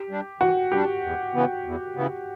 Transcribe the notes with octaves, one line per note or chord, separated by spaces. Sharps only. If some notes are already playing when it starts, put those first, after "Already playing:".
Already playing: G4
G3 D4
E3 F#4
G3 D4 G4
E2
C#3 E3 B3
E2
C#3 E3 B3